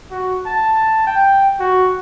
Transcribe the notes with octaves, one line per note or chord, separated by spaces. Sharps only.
F#4
A5
G5
F#4